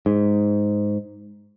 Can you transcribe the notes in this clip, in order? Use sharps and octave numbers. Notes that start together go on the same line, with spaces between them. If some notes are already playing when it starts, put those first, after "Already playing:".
G#2